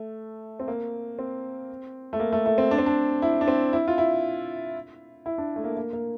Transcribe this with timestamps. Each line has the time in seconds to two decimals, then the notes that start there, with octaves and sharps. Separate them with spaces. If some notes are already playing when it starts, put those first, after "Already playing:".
Already playing: A3
0.60 C4
0.68 A#3
1.19 C4
2.13 A3
2.20 A#3
2.33 A3
2.46 A3
2.58 C4
2.71 D4
2.79 C4
2.86 D4
3.22 E4
3.41 D4
3.48 C4
3.73 E4
3.88 F4
3.98 E4
5.26 E4
5.38 D4
5.56 A3
5.64 A#3
5.77 A#3
5.93 A#3